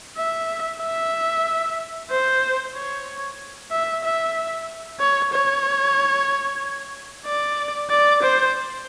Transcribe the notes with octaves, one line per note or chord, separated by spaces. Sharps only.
E5
E5
C5
C#5
E5
E5
C#5
C#5
D5
D5
C5